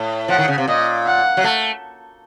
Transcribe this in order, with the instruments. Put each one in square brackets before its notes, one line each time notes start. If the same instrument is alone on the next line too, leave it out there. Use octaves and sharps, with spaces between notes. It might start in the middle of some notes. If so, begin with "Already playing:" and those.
Already playing: [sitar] A2
[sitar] F3 [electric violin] F#5
[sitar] D#3
C#3
C3
[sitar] A#2 [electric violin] D#5
[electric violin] F#5
[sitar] F#3
A3